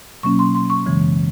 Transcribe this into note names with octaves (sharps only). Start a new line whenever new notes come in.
B2 F#3 A#3 C#4 C#6
C6
C6
C#6
F#2 C#3 E3 G#3